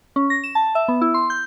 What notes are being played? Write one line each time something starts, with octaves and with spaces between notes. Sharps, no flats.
C#4
A#6
E7
A5
E5
B3
E4
C6
G6